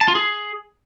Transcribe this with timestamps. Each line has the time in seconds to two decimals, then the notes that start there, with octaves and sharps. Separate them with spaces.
0.01 A5
0.08 F4
0.15 G#4